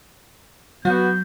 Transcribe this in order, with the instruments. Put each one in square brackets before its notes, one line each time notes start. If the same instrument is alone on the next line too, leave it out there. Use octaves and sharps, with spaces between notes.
[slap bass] F#3 [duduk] B3 [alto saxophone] F#4 [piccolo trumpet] G6